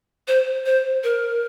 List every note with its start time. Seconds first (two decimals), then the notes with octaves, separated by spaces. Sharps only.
0.28 C5
0.66 C5
1.04 A#4